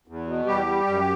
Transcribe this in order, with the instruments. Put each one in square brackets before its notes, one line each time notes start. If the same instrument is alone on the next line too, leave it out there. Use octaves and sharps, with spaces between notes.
[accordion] E2
B2
E2 G3 G4
G3
F#2